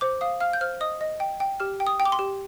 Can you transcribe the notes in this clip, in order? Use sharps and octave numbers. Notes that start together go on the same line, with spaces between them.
C5 D6
F5 D#6
F5 F6
G6
C5 F6
D#5 D#6
D#5
G5
G5
G4 F6
G5
D#6
G5
D6
C6
G4